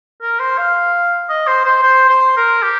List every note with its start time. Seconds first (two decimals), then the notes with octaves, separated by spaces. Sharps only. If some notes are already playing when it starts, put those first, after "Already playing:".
0.21 A#4
0.40 C5
0.58 F5
1.29 D#5
1.47 C5
1.65 C5
1.83 C5
2.09 C5
2.37 A#4
2.63 G4